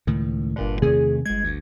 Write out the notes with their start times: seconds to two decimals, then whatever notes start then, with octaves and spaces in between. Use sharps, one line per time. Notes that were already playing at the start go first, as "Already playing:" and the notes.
0.07 C#2 A2 D#3
0.56 G1 G2 A#2 D3
0.82 E2 C3 D#3 A3 G#4
1.26 G1 G#3 G#6
1.44 D2